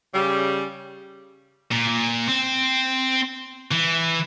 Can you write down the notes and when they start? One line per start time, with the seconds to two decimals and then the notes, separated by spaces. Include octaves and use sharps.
0.13 C#3 G3
1.72 A#2
2.28 C4
3.71 E3